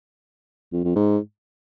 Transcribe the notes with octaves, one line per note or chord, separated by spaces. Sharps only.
F2
F2
G#2